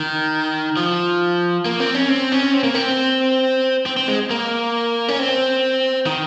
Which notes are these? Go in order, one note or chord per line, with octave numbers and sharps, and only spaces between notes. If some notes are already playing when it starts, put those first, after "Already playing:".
Already playing: D#3
F3
A#3
C4
C#4
C4
C#4
C4
A#3
C4
C4
C4
G#3
A#3
C#4
C4
D#3